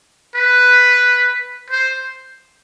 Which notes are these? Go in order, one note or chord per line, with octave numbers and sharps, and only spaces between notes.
B4
C5